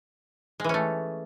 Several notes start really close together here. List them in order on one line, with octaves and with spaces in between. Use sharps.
G#3 E3 C#4 A3